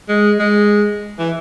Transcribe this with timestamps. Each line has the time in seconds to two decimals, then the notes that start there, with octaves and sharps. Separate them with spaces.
0.09 G#3
0.39 G#3
1.19 E3